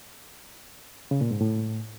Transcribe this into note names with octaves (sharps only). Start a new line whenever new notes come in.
C#3
A#2
G#2
A2